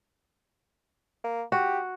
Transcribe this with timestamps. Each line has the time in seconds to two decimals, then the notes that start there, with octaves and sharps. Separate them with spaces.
1.24 A#3
1.52 F#4 G4